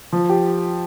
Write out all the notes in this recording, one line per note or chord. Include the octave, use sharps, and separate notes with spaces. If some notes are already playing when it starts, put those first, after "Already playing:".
F3
G4